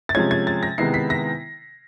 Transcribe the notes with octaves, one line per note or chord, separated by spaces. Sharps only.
A6
C3 F3 G#3 C#4 G#6
G#6
A6
A#6
C3 D#3 G#3 B3 E4 C7
B6
A#6